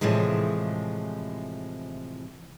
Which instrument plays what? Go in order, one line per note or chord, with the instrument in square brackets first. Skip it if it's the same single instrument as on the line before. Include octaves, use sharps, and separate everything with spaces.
[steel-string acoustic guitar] A2 C3 E3 F3 G#3